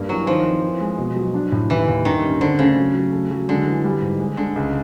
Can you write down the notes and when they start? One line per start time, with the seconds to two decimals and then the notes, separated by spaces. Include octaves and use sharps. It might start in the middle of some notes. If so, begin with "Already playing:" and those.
Already playing: G2 A#3
0.08 E3 F#3
0.26 D#3 F3
0.44 C4
0.62 E3
0.80 G#3
0.98 B2
1.16 F#3
1.34 D4
1.52 A2
1.69 D#2 E3
1.88 D#2
2.05 G2 D#3
2.23 C#4
2.41 D3 C4
2.59 C#3 A3
2.76 F#3
2.95 F#3
3.12 A3
3.31 F#3
3.48 D3 G#3
3.66 E3
3.84 G3
4.02 G#2
4.20 G#3
4.37 D3 G#3
4.56 C#2